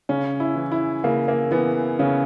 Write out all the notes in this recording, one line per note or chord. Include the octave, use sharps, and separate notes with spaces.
C#3 C#4
E4
E3
E4
C#3 A#3
A#3
E3 B3
C#3 C#4